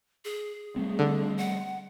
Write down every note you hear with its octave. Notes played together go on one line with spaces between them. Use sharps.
G#4
G3 A3 C4
D3
F#5